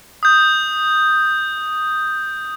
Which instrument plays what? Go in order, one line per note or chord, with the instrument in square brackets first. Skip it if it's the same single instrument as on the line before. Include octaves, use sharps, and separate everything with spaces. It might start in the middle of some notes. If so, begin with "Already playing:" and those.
[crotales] D#6 G6